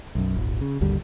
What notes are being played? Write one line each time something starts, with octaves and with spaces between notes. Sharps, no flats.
B1 F#2
D#1 G#1
C#3
G#1 D#2 D3 G3